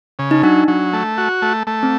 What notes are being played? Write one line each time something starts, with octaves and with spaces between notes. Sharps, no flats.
C#3
D#4
F#3 D4
F#3
A3
F#4
A3
A3
C4